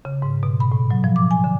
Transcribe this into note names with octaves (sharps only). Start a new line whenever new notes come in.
C#3
G#2
B2
B5
A2
F#3
F3
D6
G#5
D3